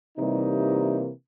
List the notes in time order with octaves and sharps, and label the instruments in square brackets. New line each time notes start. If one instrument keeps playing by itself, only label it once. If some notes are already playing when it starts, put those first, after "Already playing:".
[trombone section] C3 E3 G3 A#3 D#4